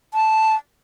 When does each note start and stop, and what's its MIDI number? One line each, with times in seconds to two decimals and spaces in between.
0.14 0.55 81